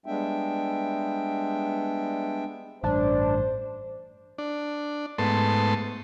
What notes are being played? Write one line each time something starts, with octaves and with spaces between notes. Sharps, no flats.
G3 G#3 B3 D4 E5 G5
A1 G2 D4 C5
D4
G#2 A3 B3 A5 C6